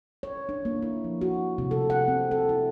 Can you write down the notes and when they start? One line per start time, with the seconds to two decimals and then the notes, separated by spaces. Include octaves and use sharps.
0.23 C#5
0.49 D4
0.65 A#3
0.82 E4
1.04 F3
1.21 F#4
1.58 C3
1.71 A4
1.90 F#5
2.08 C4
2.31 A4
2.49 E4